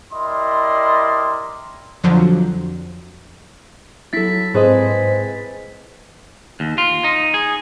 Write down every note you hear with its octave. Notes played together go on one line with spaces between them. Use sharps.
G3 E4 A#4 D5 D#5 C6
F2 D3 F3 F#3 C4
F#3 E4 A4 A6 B6
G#2 C4 G#4 B4 C5 D#5
D#2
F4
D#4
G#4